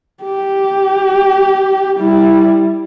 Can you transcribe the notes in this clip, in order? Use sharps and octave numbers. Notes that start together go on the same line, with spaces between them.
G4
G3 E4